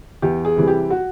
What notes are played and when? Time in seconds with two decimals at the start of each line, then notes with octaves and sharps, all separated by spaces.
0.22 E2 G4
0.45 G#4
0.56 C3 E3 G3
0.68 G4
0.90 F#4